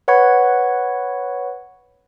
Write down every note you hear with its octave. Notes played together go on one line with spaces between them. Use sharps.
B4 C#5 F#5 B5 C#6 G#6